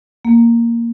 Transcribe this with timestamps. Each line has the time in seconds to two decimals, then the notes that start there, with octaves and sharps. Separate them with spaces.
0.25 A#3